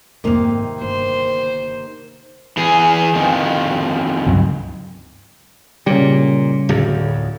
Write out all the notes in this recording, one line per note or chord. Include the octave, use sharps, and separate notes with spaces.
F2 G#2 C3 D#3 A#3
G1 C5
E3 G#4
F2 D#3
C#2 G2 F#3
A#2 C#3 G3
D1 F2